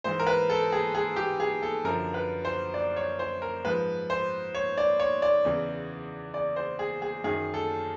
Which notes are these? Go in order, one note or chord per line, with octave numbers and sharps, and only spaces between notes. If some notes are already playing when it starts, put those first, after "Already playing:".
G#2 E3 C5
A#4
B4
A4
G#4
G#4
G4
G#4
A4
F#2 D3 F3 A#4
B4
C5
D5
C#5
C5
A#4
G#2 F3 B4
C5
C#5
D5
C#5
D5
E2 C#3 E3
D5
C5
G#4
G#4
F#2 D#3 G#4
A4